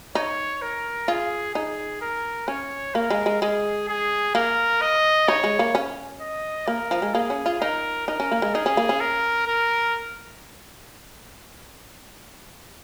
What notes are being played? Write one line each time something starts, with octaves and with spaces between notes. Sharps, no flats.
D#4 C#5
A#4
F4 G#4
D#4 G#4
A#4
C#4 C#5
A#3 A#4
G#3
G#3
G#3 G#4
G#4
A#3 A#4
D#5
D#4 C#5
G#3
A#3
C#4
D#5
A#3 A#4
F3
G#3
A#3 G#4
C#4
F4
D#4 A#4
D#4 A#4
C#4
A#3
G#3
D#4 G#4
C#4
A#3
C#4
A#4
A#4